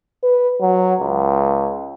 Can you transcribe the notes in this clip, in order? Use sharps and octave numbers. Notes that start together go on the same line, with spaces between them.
B4
F#3
C#2